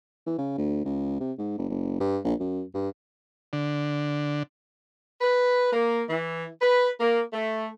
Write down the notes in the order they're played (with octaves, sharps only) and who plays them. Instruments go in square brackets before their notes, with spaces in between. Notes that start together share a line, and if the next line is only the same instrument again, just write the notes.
[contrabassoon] E3
C#3
D2
C#2
C3
G#2
F#1
F#1
G2
A#1
F#2
G2
[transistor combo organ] D3
[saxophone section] B4
A#3
E3
B4
A#3
A3